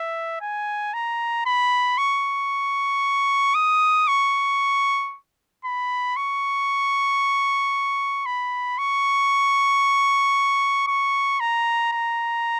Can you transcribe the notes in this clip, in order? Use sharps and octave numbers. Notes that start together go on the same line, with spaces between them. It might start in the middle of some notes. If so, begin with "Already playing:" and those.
Already playing: E5
G#5
A#5
B5
C#6
D#6
C#6
B5
C#6
B5
C#6
C#6
A#5
A#5